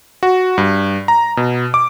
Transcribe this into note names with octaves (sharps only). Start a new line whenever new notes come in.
F#4
G2
A#5
B2
D6